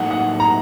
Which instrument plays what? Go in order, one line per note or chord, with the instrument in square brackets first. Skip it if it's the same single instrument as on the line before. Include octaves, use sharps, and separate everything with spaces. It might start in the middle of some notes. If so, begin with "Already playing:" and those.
Already playing: [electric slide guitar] A2 F#3 A#3 D#4 A4 [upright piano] F#5
[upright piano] F#5
A#5